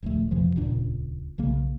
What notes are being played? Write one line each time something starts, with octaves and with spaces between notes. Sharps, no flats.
D#1 A#1 D#2 A3
F2 C3 E3 F3
D#1 C#2 A#2 D4
B1 C#3 A#3